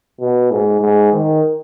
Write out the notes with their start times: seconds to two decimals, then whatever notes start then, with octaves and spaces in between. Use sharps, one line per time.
0.20 B2
0.51 G#2
0.81 G#2
1.13 D#3